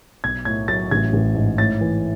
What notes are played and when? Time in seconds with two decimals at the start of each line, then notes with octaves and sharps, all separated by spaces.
0.24 B1 G#6
0.45 A2 G#6
0.68 F#3 A6
0.91 A1 G#6
1.13 A1
1.35 G#2
1.58 A2 A6
1.81 E3